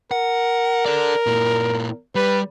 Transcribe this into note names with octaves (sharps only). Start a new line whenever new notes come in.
A#4 F#5
A4 D5
A#2 E4
G3 B4